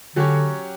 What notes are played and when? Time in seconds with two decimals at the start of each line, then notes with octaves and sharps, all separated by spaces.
0.16 D3 F#3 C#4 G4 C#5